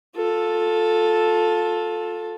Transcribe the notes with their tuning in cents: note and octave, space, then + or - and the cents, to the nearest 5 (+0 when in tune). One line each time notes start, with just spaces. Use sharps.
F4 +25 A4 +0